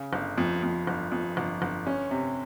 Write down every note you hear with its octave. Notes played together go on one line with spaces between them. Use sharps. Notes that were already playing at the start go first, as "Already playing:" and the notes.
Already playing: C#3
G1
F2
F2
G1
F2
G1
G1
C#4
C3